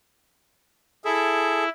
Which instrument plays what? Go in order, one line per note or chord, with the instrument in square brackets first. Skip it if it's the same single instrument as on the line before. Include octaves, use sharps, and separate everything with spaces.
[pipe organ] E4 [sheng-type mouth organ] G#4 A4 E5